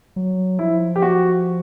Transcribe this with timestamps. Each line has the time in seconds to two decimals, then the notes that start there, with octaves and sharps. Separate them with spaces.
0.16 F#3
0.58 F3 E4
0.96 G4
1.02 F#4